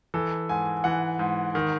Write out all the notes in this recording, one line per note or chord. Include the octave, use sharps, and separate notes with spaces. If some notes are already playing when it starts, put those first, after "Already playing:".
E3 A4
G#2 G#5
E3 F#5
G#2
D#3